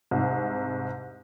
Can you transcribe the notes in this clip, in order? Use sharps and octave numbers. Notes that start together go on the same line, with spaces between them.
C2 G#2